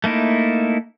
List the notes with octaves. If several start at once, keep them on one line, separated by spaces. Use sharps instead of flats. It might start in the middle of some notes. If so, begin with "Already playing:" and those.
A3 A#3 D#4 E4